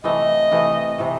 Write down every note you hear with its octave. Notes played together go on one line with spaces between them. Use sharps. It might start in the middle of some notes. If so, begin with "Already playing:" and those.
C3 E3 A3 D#5
C3 E3 A3
C3 E3 A3